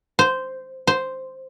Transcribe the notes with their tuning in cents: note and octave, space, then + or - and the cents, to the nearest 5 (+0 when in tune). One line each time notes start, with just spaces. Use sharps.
C5 -10
C5 -5